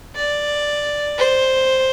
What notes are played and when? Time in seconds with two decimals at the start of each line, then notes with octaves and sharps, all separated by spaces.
0.15 D5
1.18 C5